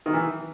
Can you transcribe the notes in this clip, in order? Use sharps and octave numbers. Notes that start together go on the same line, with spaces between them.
D#3
E3